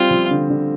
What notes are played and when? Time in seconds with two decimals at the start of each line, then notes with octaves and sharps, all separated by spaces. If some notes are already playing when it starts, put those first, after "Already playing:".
Already playing: G3 C4 F4
0.11 F3
0.31 D3
0.50 D3